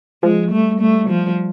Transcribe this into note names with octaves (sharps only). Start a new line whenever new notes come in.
F3 G#3
G3 A3
A3
F3